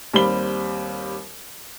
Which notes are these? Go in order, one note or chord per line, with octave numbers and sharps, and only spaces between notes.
D#2 G3 C4 B5 G7